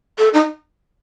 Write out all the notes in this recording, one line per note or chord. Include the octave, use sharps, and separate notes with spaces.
A4
D#4